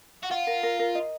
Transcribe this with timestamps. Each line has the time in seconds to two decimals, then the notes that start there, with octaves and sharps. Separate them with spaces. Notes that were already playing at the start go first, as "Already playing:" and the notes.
0.23 F#4
0.31 F4 F#5
0.47 A#4
0.63 A#4
0.79 A#4
0.95 D#5